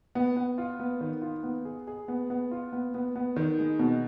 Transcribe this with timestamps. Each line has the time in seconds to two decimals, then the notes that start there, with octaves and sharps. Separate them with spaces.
0.15 B3
0.36 B3
0.58 F4
0.80 B3
1.01 D#3
1.22 F4
1.43 B3
1.65 G#4
1.87 G#4
2.08 B3
2.30 B3
2.51 F4
2.73 B3
2.94 B3
3.16 B3
3.36 D#3
3.59 G#3
3.79 B2